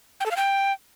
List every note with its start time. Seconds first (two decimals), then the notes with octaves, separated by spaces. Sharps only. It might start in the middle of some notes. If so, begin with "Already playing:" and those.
0.20 G5
0.26 A4
0.31 F5
0.36 G5